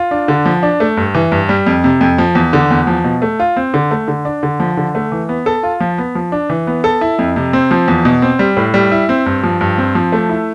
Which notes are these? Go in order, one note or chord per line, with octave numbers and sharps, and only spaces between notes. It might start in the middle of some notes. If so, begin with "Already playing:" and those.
Already playing: F4
D4
D3
F3
D4
A3
G2
E3
G2
G3
F2
C3
F2
F3
E2
D3
E2
F3
B2
A3
F4
C4
D3
A3
D3
D4
D3
F3
D3
A3
E3
B3
A4
F4
F3
B3
F3
D4
E3
B3
A4
E4
F2
C3
C4
F3
E2
B2
C4
G3
A2
G3
E4
C4
G2
F3
G2
C4
F3
A3
E4